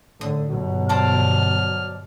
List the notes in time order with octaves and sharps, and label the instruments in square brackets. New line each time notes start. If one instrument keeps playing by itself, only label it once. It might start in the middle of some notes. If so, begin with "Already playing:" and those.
[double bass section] G#1 A2 D3 [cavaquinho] D#6
[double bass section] G1 B2 [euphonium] F#3
[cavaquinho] C5 D5 A5 [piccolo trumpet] F6